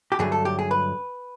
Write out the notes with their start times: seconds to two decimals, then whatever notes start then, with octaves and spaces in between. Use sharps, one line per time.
0.12 G4
0.19 G2 D3 F#3 A3 G#4
0.32 A4
0.45 G4
0.59 G#4
0.71 B4